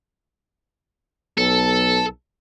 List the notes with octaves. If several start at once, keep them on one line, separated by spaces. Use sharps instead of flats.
B1 A4